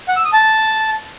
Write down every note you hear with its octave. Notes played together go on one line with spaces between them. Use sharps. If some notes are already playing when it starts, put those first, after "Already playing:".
F#5
E6
D#6
A5